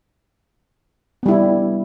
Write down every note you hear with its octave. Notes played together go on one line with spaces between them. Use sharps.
G3 B3 E4